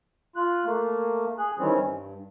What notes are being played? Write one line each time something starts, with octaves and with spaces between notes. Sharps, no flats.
F4 F#6
A3 A#3
G#4 F#6
D#3 E3 G3 C4 C#4
G2